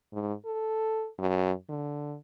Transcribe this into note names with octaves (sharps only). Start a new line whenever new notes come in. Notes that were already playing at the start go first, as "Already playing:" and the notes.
G#2
A4
F#2
D3